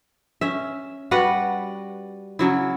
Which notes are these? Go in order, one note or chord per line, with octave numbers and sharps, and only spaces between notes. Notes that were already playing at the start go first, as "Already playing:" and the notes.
C#4 E5
G3 F#4 B4 F#5
C#3 F#3 E4